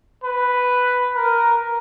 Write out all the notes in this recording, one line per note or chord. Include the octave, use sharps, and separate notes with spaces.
B4
A#4